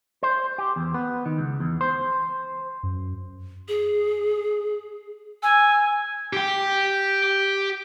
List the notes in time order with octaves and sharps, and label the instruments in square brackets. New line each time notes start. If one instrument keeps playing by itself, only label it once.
[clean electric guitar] C5
G4
E2
B3
D#3
C#2
E2
C5
[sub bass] F#2
[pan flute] G#4
[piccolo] G#5 [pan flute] E6
[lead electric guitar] G4 G5